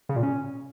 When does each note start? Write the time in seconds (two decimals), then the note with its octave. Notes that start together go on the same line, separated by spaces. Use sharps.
0.09 C#3
0.16 A#2
0.23 C#4